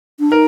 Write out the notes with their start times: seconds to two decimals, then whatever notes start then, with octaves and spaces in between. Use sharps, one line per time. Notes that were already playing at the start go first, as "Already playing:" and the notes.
0.20 D4
0.31 D#4 A#4